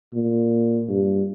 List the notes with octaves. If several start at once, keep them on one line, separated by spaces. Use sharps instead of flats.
A#2
G2